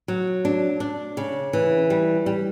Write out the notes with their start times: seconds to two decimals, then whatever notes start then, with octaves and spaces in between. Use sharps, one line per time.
0.08 F#3
0.45 D4
0.80 D4
1.17 C#3
1.53 E3
1.90 G3
2.26 G3